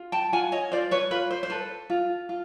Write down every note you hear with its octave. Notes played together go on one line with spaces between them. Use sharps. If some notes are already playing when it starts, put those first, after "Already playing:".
Already playing: F4
G5 A5
F4 F#5 G#5
C#5 D#5
F4 C5 D5
B4 C#5
F4 B4
C5
C5
A4 B4
F4
F4